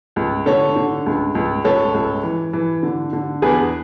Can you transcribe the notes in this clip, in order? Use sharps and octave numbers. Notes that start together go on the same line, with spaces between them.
C#2
D3 A4 C#5
D3
C#2
C#2
C#2 A4 C#5
C#2
E3
E3
D3
D3
E2 G#4 B4